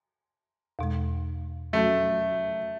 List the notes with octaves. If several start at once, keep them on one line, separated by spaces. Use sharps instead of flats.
E2 B2 G#3
F#3 A3 C#4 F#4 A4